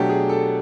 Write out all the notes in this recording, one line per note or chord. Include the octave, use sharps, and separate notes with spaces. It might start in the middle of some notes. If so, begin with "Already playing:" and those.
Already playing: B2 F#3 A3 D4 G4
G#4
A4